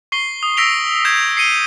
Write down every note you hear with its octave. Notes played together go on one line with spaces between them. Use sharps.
C#6 C7 G7
D#6
E6 A#6 B6 D7 F7 G7
E6 G6 G#6 E7
C7 C#7 D#7 G7